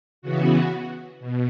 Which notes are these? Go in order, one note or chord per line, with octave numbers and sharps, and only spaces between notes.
C#3 E3 B3 F#4
B2